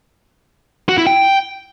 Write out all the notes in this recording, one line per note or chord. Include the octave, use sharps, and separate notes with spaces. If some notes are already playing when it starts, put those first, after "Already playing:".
F#4
E4
G5